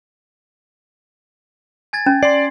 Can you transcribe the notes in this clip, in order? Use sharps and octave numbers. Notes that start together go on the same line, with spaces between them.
G#5 G#6 A6
C#4
D5 C6 C7